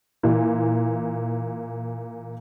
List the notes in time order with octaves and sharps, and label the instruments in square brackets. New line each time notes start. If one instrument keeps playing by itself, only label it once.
[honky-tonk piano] A#2 E3